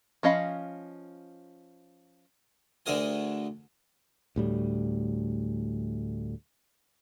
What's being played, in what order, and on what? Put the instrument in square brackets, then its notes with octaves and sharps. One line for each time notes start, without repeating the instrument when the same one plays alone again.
[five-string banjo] F3 C#4 D#5 F5 B5
[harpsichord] D2 D3 A3 G#4 A#4 G#5
[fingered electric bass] D2 A2 G3